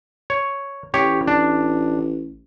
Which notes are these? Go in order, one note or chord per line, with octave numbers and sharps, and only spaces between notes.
C#5
A1 G4 C#5
D4